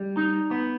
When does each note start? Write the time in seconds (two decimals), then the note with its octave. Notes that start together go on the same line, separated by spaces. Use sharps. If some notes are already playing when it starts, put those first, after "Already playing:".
Already playing: G3
0.17 D#4
0.51 B3